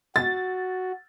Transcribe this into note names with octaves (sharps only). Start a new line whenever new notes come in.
F#4 A6